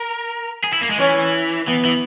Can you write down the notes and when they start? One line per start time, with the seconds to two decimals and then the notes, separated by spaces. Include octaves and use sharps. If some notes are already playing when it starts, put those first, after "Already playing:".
Already playing: A#4
0.64 G#4
0.73 E4
0.82 A#3
0.91 G#3
0.98 E3 C#4
1.67 E3 B3
1.85 E3